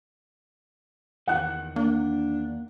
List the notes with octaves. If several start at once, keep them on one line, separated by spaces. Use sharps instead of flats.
E2 D#3 F#5 F#6
A#3 D4